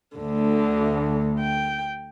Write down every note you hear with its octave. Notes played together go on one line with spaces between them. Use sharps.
D2 D3
G5